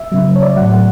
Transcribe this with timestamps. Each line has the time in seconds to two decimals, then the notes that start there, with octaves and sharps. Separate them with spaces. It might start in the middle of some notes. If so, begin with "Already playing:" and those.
Already playing: E5
0.12 C#3 F#3
0.36 C#5
0.43 D5
0.50 E5
0.57 A2 F#3 F#5
0.73 F#5